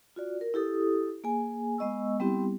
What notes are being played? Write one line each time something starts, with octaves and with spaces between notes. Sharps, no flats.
F4 F#4 D5
A#4
E4 G4 A4 D#6
A#3 G#4 G#5
G#3 B3 D#5 C#6 E6
G3 B3 C4 E4 G4